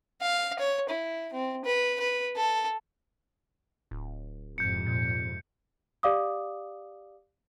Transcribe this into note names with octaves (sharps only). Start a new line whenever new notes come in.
F5
C#5
E4
C4
B4
B4
A4
D1
F2 G#2 C3 G6 C#7
A#2
G4 D5 F5 D6 D#6